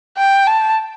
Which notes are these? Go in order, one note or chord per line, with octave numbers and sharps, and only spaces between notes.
G5
A5